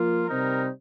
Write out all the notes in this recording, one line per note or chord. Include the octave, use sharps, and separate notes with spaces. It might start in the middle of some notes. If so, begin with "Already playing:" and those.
Already playing: F3 A#3 F4
C3 G3 C4 D#4 A#4